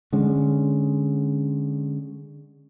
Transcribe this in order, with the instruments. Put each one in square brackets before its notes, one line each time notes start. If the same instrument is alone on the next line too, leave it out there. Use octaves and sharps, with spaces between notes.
[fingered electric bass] D3 G#3 C#4